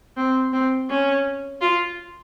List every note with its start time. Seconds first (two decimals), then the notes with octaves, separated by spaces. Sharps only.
0.17 C4
0.53 C4
0.90 C#4
1.61 F4